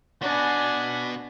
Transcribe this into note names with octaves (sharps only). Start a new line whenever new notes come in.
B3 D4 F#4 G#5